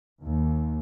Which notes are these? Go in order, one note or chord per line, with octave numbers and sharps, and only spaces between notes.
D#2